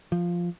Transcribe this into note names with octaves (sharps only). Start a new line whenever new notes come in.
F3